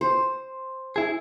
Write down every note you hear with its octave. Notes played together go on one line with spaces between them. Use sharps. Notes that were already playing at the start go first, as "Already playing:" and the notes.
C5
E4 G#4